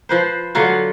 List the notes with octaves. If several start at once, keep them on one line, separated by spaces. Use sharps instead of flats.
F3 B4 C5
D3 F#3 F4 F#4